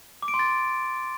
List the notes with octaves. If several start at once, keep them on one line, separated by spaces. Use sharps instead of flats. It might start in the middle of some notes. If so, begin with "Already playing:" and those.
D6
D7
C6
A6